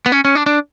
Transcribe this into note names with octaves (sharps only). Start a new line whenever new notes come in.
B3
C#4
C#4
D4
D4